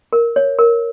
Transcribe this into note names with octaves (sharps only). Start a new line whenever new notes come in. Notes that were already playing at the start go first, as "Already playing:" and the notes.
A#4
C#5
A#4